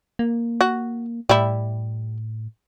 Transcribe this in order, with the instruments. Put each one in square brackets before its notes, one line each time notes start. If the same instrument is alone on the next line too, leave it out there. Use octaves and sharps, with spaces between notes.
[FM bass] A#3
[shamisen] F#4
[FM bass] A2 [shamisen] G3 E4